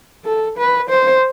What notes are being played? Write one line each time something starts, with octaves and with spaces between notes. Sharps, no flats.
A4
B4
C5